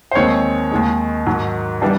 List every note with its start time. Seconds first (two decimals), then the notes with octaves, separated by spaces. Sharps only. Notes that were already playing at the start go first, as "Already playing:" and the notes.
0.11 C5
0.15 D#2 D#3 G#3 C4 C#5
0.71 D#2 D#3 G#3
1.26 G#2 D#3 F#3
1.82 E3 G3 B3 D4